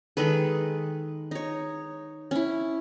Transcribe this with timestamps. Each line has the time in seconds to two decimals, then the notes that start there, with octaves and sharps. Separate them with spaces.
0.17 D#3 G#3 A4 B4
1.31 D#4 C#5
2.31 C#4 E4